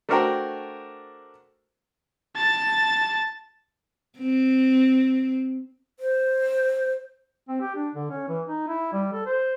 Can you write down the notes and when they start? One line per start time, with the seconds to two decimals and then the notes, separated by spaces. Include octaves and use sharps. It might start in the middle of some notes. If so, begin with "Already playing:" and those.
0.09 A3 D4 F#4 A#4 C5 G5
2.36 A5 A6
4.19 C4
6.00 C5
7.49 C4
7.61 G4
7.76 D4
7.95 D3
8.10 C#4
8.28 E3
8.48 D#4
8.68 E4
8.93 G3
9.13 A4
9.26 C5